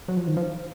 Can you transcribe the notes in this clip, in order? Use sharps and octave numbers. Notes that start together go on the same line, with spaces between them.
F#3
F3
D#3
F3